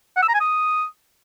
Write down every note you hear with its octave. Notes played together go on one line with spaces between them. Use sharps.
F#5
E6
A#5
G#5
D#6